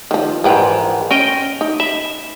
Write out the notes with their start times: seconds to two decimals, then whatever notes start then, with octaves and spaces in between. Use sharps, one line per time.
0.11 D#3 F3
0.44 A#1 G#2 E3 B4 G5
1.11 C#4 A#4 D#5 G5
1.61 D#4
1.80 E5 B5